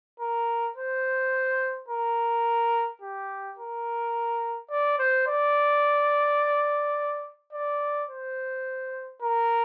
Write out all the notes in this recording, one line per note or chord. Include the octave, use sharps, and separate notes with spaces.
A#4
C5
A#4
G4
A#4
D5
C5
D5
D5
C5
A#4